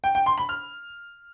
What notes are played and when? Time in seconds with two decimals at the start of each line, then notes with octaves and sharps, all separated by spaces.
0.04 G5
0.15 G5
0.26 C6
0.38 B5
0.49 F6